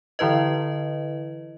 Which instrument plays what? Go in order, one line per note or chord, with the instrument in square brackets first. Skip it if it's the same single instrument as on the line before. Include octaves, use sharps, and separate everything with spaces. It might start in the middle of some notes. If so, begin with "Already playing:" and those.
[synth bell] D3 E3 E4 B4 D#5